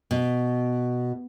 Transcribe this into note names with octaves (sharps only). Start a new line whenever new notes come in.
B2